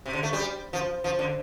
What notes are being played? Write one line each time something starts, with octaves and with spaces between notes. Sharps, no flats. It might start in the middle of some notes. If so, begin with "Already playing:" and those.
C3
D3
A3
G3
F3
F3
D3